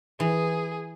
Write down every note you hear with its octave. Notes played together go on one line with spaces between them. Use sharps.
E3 G#4